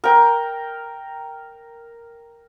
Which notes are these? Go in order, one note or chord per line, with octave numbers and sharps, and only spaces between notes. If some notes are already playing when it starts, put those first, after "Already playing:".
A#4 G5